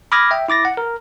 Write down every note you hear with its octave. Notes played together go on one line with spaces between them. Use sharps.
B5 D6 D#6 F6 G#6 A#6
E5 G5
E4 D6 A6 A#6
F#5
A#4